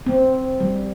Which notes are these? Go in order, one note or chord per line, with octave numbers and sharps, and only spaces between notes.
C4
G3